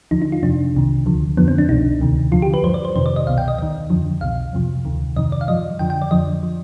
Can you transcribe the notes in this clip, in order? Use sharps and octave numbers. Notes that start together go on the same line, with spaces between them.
D#2 D3 F3 D#4
D#4
F4
F2 C3 F3 D4
C2 C3 D#3
D2 D3 F3
F2 D3 F3 B3
C4
D4
C2 B2 D#4
D2 C3 D#3
D#2 D3 F3 F4
G4
B4
G2 F3 C5
D5
C5
F2 C3 D#3 C5
D5
D#5
C2 B2 F5
G5
D#5
D#2 D#3 D#5
F2 D3 F3
C2 B2 F5
F2 C3 F3
D2 C3 D#3
F2 C3 D#3 D#5
D5
F5
G2 F3 D#5
F2 D3 F3 G5
G5
D5
F2 D3 F3 D#5
F3